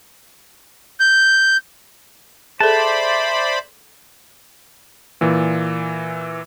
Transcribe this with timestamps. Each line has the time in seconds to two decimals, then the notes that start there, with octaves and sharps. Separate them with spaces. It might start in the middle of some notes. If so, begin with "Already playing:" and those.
1.00 G6
2.60 G#4 A4 C5 D5 E5 A5 B5
5.21 A#2 E3